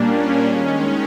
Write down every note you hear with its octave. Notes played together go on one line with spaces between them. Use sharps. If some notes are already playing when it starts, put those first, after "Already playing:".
Already playing: A#2 G3 A#3 C#4 D4
D#3 G#3 C#4